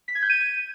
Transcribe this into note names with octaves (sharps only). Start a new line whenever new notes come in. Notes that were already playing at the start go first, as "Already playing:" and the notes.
B6
G#6
G6
D#7